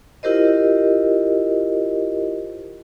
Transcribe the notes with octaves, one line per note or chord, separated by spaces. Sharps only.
E4 F4 G4 A#4 C5 D#5